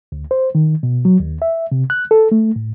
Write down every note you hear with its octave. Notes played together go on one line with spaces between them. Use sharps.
D2
C5
D#3
B2
F#3
D#2
E5
C3
F#6
A4
A3
A2